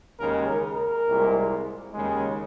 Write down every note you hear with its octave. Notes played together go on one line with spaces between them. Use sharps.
D#2 C#3 G#3 A#4
A#4
A#4
C2 A#2 G#3
D#2 C#3 G#3